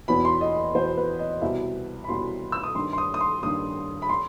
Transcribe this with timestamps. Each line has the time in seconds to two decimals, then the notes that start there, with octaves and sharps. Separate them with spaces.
0.08 E2 B2 B5
0.25 C6
0.41 D#5
0.75 E2 B2 C5
0.97 B4
1.19 D#5
1.42 C2 B2 E5
2.04 B5
2.09 C2 B2 C6
2.52 E6
2.63 D#6
2.75 G2 D#3 C6
2.93 C6
2.98 D#6
3.14 D#6
3.20 C6
3.43 G2 D#3 D#6
4.02 B5
4.09 C6